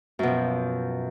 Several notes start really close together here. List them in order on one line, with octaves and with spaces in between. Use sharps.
F#2 B2 F3